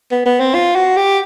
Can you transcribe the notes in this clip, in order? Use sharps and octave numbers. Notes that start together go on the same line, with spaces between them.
B3
B3
C4
F4
F#4
G4